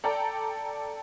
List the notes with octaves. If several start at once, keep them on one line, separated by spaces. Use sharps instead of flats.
A4 D5 G5 A#5